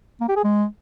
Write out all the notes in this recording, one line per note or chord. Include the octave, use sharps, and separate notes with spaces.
A#3
G4
G#4
G#3